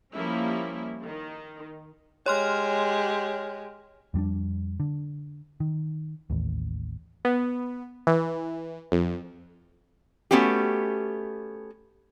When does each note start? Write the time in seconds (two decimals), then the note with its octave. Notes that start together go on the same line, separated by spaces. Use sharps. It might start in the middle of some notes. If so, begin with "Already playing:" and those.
0.13 F3 G3 A#3 C#4 E4
1.05 D#3
2.26 G#3 G4 C#5 C6 F6
4.14 F2 G3 C4 D4
4.80 D3
5.60 D#3
6.30 A1 D#2
7.25 B3
8.07 E3
8.92 F2
10.31 A3 B3 C#4 F#4 G4